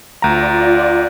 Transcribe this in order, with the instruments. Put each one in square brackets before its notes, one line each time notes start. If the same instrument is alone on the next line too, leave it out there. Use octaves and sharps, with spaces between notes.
[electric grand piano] D2 A#5 [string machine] F4 D5